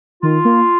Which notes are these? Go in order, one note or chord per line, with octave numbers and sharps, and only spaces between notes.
D#3 F4
A#3